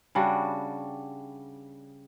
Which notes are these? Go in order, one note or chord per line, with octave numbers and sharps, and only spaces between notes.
C#3 G3 D4 F#4